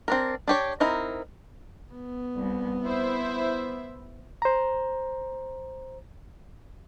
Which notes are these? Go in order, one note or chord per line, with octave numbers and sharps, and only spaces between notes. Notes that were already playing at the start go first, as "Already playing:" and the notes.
C4 D4 A#4
D4 G4 C#5
C4 D#4 E4 A#4
B3
C2
E4 C5 E5
C5 A#5